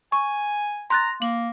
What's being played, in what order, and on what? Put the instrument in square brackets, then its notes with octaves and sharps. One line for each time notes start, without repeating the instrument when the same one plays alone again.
[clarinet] G#5 [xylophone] C#6
[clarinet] A#5 [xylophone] C6 F#6 A6
[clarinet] A#3 [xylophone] F#7